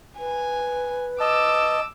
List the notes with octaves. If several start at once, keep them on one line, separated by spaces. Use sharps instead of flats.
B4 G#5
D#5 A5 D6 E6